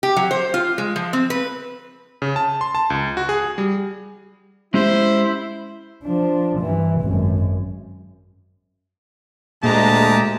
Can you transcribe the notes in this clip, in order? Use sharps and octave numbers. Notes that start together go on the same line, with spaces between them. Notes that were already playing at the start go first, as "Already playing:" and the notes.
G4
F#3
C5
F4
G#3
F3
C4
B4
C#3
A5
C6
A5
C#2
F#4
G#4
G3
G#3 C#4 E4 G4 C5
F3 D4
G2 E3
G#1 F#2
D2 A#2 G#3 G4 D#5 A5 A#5